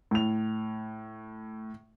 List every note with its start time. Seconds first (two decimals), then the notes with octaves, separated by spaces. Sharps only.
0.11 A2 F7